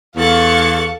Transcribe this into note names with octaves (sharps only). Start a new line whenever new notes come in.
E2 A4 F5 C#6 F#6 A6